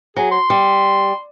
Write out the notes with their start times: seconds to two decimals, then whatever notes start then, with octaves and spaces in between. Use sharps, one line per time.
0.16 F#3 G#4
0.32 C6
0.50 G3